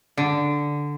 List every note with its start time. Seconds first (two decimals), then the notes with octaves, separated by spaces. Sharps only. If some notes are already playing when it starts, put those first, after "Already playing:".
0.17 D3